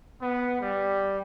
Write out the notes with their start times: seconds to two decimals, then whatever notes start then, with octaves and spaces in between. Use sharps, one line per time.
0.20 B3
0.59 G3